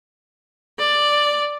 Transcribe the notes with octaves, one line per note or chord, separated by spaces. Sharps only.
D5